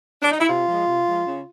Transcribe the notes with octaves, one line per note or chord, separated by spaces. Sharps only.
D4
D#4
E4
C3 F4
F3 G#3
C3
F3 G#3
C#3